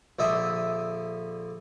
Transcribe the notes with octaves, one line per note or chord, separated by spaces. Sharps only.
A#1 D3 E5 D#6